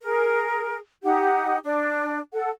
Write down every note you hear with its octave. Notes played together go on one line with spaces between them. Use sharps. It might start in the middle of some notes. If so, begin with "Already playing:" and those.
G#4 A#4
D#4 G4 F#5
D4 D5
A4 F#5